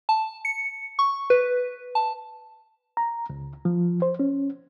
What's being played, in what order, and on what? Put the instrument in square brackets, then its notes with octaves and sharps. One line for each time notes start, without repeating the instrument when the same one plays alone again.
[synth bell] A5
C#7
C#6
B4
A5
[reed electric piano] A#5
C#2
F3
C5
C#4